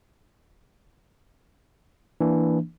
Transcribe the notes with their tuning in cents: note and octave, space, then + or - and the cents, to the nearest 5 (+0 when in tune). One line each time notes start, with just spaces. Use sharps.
E3 +0 A#3 +0 D4 +0